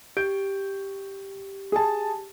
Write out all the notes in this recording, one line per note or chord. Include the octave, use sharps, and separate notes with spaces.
G4 G6 D7
G#4 A5